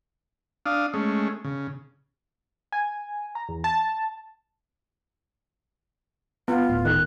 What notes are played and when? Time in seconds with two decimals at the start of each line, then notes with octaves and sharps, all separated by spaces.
0.66 D4 F5 D#6
0.94 G#3 A3 C#4
1.44 C#3
2.72 G#5
3.35 A#5
3.48 E2
3.64 A5
6.48 B3 F4
6.69 D1 A2
6.85 D#3 F#6